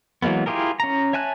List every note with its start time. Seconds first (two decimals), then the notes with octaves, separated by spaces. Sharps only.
0.22 E3 F#3 G#3 A#3 B3
0.46 E4 F4 G4 G#4 A#4
0.80 C#4 A#5
1.13 C#5 E5 G#5 A5 F#6